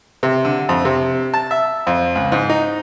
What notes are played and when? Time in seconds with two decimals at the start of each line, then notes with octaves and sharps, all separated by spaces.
0.23 C3
0.45 D3
0.69 F2
0.85 C3
1.34 A5
1.51 E5
1.87 F2
2.15 C#2
2.32 G#2
2.50 D#4